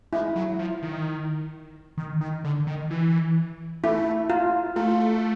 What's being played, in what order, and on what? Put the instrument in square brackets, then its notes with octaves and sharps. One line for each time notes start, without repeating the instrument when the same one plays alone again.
[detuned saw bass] G#3 [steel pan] E4
[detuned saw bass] F#3
F3
D#3
D#3
D#3
D3
D#3
E3
[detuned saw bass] A3 [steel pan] E4
[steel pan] F4
[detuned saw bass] A3 [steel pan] F4